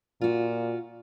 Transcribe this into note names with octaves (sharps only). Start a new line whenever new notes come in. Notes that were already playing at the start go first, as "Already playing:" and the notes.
A#2 F4 F#4